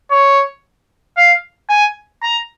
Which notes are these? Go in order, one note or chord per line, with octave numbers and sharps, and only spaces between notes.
C#5
F5
G#5
A#5